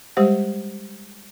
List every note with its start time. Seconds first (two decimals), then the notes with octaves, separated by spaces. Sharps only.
0.17 G3 G#3 G4 C5 F#5